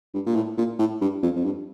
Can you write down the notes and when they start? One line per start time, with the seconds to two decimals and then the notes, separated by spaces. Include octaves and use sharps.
0.14 G2
0.26 A#2
0.35 A2
0.57 A#2
0.79 A2
1.01 G2
1.23 F2
1.36 F2
1.44 G2